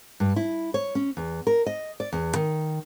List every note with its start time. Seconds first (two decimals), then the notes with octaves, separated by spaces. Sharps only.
0.20 G2
0.36 E4
0.74 C#5
0.95 C#4
1.17 E2
1.47 A#4
1.66 D#5
2.00 D5
2.12 E2
2.36 D#3